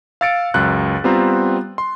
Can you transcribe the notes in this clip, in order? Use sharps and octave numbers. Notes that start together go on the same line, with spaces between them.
F5 E6 A6 C#7 D7
C#2 F#2 F#6
G3 B3 C4 F4 A#5
C6